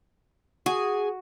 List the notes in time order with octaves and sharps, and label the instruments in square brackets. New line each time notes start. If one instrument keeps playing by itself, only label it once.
[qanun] F#4 [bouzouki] G#4